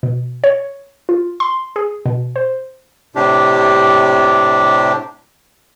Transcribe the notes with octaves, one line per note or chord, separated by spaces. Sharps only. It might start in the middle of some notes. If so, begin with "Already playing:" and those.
B2
C#5
F4
C6
G#4
B2
C5
A2 C3 D4 G4